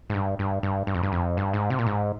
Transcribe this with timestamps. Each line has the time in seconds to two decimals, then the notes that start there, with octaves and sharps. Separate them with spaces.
0.10 G#2
0.14 G2
0.39 G2
0.63 G2
0.87 G2
0.95 F2
1.03 G2
1.12 F2
1.37 G2
1.53 G#2
1.70 C3
1.79 A#2
1.86 G#2